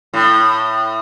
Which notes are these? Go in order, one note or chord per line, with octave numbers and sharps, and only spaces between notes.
A2